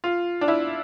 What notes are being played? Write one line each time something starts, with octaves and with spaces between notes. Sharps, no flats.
F4
D4
E4